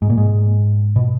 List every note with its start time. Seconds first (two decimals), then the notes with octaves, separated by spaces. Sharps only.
0.02 G#2
0.10 A#2
0.18 G#2
0.96 B2